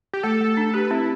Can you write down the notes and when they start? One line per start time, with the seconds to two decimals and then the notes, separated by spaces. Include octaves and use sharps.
0.13 G4
0.23 A3 A4
0.41 A3
0.57 D4
0.74 G4 B4
0.91 C4 E4